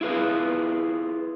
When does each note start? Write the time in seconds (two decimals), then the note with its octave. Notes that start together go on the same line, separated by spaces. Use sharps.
0.01 E4 F4 G#4 B4